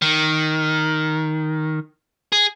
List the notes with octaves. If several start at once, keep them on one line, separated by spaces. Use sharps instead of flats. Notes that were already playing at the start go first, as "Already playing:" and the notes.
D#3
G#4